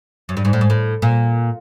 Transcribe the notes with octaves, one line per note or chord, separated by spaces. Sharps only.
F#2
G2
G#2
A2
G#2
A2
A#2